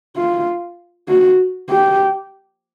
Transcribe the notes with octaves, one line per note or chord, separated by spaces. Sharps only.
F4
F#4
G4